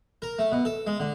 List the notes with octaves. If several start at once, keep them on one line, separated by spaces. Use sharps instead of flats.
A#4
A3
B2
A4
G#3
D3